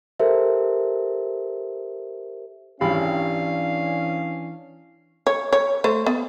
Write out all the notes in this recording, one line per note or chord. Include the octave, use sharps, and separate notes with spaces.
G4 A4 A#4 C5 E5
G#1 E3 G3 C#4 D4 F5 B5
C#5
C#5
A3 C5
B3